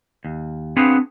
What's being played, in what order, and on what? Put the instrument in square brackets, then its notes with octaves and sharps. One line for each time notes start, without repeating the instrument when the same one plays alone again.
[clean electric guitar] D#2
B3 C4 D4 F4 G#4 B4